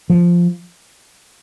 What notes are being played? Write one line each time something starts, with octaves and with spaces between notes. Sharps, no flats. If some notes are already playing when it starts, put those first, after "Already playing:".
F3